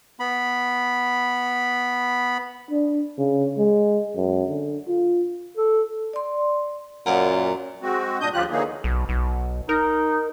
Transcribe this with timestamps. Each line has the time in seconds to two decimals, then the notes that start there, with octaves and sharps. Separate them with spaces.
0.20 B3 B5
2.71 D4
3.18 C#3
3.58 G#3
4.16 F#2
4.49 D3
4.88 F4
5.57 A4
6.13 D5 C6
7.06 F#2 A#2 F#5
7.82 G#3 C4 F#4
8.20 G2 A#2 D4 D#5 D#6 G6
8.33 D2 C#3 F3 F4 G4 F#6
8.51 D3 E3 F#3 A#3 D#4 G#4
8.84 B1
9.09 B1
9.69 D#4 A#4